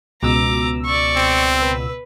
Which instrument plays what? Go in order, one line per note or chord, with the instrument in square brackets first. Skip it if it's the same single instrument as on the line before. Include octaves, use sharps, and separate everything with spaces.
[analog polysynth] C#2 B2 E6 [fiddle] A#5 D6
[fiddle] D5 C#6
[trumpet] C4
[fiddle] B4